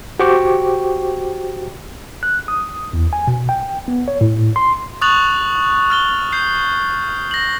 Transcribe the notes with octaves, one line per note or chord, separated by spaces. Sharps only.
F#4 G4 C5 G5 C#6 D6
F#6
D#6
E2
G#5
B2
G5
B3
C#5
A2
C6
C#6 D#6 F#6 A6 F7 F#7
F6 A6 G7
G6 C7
A#6 F#7